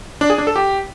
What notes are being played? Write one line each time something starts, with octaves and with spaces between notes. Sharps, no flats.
D4
G#4
D4
A4
G4